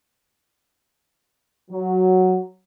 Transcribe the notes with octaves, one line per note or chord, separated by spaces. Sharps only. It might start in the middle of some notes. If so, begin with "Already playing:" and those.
F#3